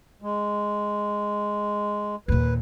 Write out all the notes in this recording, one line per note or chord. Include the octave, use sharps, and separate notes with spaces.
G#3
D#2 A#2 B4